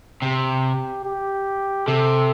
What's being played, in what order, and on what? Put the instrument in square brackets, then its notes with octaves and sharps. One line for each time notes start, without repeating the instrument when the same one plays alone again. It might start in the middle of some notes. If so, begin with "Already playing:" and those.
[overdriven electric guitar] C3 [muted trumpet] G4
[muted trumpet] G4
[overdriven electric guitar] C3 [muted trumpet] A4